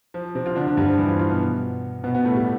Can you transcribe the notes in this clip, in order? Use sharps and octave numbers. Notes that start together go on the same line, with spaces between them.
F3
C3 C4
F3 F4
D3 D4
D3 D4
G2 G3
F3
E3 E4
F3 F4
F3 F4
B2 B3
B2 B3
B2 B3
A2 A3
G3